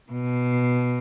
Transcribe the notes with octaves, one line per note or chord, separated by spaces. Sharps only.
B2